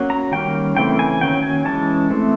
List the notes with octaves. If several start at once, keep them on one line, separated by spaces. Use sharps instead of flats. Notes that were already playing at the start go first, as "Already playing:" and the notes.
Already playing: F#3 A#3 C#4
A#5
D#3 G3 A#3 C#4 G5
C#3 E3 A3 C4 G5
G#5
D#3 F#3 A#3 C#4 G5
G#5
E3 G#3 C#4 A5
E3 A3 C4